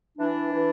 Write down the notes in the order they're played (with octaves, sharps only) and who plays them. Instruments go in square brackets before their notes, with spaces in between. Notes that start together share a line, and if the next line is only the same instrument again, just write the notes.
[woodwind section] E3 D4
E3